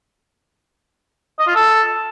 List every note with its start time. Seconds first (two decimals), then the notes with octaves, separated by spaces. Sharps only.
1.39 D#5
1.47 F4
1.55 A4